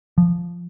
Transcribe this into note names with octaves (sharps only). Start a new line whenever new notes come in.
F3